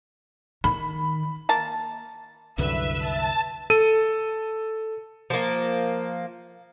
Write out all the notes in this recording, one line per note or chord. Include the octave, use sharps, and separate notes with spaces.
D#3 B5
A#3 A5
C2 F#2 D3 B4 E5
A5
A4 D#7
F3 A#3